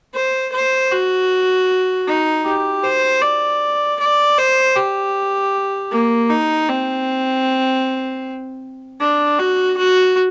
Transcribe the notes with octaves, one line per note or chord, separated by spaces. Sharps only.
C5
C5
F#4
D#4
G4
C5
D5
D5
C5
G4
A#3
D#4
C4
D4
F#4
F#4